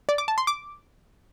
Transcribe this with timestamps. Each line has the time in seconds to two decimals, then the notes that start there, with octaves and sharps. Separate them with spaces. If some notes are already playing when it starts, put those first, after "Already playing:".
0.09 D5
0.18 D6
0.28 A5
0.38 C6
0.47 D6